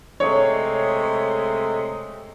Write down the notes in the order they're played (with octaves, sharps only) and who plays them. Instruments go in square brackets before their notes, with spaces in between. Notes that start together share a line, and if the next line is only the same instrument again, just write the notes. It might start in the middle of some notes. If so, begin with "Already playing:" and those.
[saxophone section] C3 G#3 A3 [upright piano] C#5